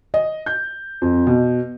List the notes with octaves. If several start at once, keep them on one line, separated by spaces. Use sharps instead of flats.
D#5
G6
F2
B2